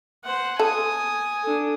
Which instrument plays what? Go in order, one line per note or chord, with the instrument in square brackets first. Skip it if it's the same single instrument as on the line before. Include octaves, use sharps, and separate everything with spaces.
[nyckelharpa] C5 F#5
[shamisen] A4 [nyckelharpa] G#5 D#6
[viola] D4 A4